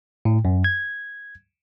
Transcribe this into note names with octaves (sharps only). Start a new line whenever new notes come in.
A2
F#2
G#6